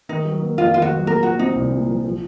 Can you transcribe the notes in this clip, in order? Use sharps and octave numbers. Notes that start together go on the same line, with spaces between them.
D#3 D#4
F#3
A#3
F2 F4
D#3 F4
F#4
F#3
A#2 A#4
F3 F#4
C4 D#4
C2
A#2
F3
F3